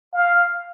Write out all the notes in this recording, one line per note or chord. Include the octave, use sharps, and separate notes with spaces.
F5